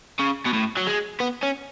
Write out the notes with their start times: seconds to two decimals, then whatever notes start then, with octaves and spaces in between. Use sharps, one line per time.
0.20 C#3
0.46 B2
0.53 A2
0.77 F#3
0.87 G#3
1.20 B3
1.43 C#4